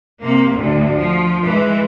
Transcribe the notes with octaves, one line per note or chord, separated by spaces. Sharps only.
C3 A#3
D2 A2
F3
E3 G#3